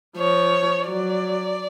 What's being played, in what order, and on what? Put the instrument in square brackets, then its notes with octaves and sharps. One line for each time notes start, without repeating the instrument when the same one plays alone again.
[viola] F3 [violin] C#5
[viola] F#3 [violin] D5